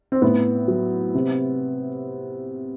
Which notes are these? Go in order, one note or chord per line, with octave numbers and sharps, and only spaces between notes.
C4
A2 B3
F#3
C3